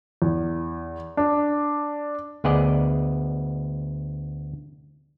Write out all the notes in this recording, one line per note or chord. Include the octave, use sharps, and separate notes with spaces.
E2
D4
D2 B3 G#4 D5 D#5